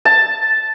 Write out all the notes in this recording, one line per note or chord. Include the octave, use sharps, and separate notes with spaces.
A5